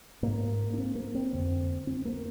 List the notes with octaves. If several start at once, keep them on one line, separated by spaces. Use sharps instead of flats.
G#2 A#3
D4
C4
A#3
C4
F2 D3
C4
A#3